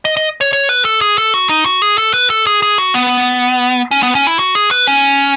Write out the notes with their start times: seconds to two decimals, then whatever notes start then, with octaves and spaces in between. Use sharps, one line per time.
0.05 D#5
0.17 D#5
0.41 C#5
0.53 C#5
0.69 B4
0.85 A4
1.01 G#4
1.18 A4
1.34 F#4
1.49 D#4
1.66 F#4
1.82 G#4
1.98 A4
2.14 B4
2.30 A4
2.47 G#4
2.63 G#4
2.78 F#4
2.94 B3
3.91 C#4
4.03 B3
4.15 C#4
4.27 E4
4.39 F#4
4.55 G#4
4.71 B4
4.87 C#4